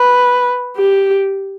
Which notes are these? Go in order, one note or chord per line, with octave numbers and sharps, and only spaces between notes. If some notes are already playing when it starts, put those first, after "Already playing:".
Already playing: B4
G4